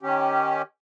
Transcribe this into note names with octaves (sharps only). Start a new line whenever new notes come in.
D#3 C#4 G4